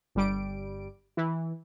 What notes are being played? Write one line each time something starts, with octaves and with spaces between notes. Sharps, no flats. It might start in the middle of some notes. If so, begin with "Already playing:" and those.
G1 G3 D7
E3